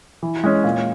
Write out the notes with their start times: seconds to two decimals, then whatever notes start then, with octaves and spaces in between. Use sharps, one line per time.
0.23 E3
0.44 G#3 C#4
0.64 A#2